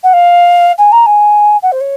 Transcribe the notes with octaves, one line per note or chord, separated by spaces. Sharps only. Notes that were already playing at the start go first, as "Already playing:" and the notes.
F#5
F5
G#5
A#5
G#5
F#5
C5
C#5